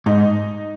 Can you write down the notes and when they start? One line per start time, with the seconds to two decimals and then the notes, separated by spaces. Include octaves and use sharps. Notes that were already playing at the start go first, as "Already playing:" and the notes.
0.06 G#2 D#4